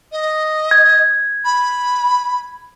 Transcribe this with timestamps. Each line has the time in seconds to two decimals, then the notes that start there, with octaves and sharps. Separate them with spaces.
0.12 D#5
0.71 G#6
1.45 B5